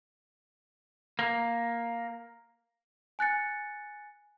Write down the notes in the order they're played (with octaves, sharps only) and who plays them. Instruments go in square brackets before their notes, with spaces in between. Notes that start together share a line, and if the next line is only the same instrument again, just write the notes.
[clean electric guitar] A#3
[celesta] G#5 F#6 A6 C#7